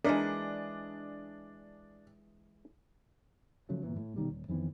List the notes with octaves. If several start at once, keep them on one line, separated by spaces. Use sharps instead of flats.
E3 G#3 D4 A#4 D#5
C#3 F3 F#3 A3
G1 A#2 E3
A2
B2 D3 D#3 G3
D#1
F2 D#3 E3 B3